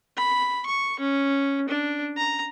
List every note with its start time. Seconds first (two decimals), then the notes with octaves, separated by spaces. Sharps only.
0.18 B5
0.66 C#6
1.00 C#4
1.69 D4
2.17 A#5